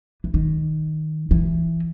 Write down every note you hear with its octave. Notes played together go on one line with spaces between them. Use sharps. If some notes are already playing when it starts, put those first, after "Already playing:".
E3
D#3
E3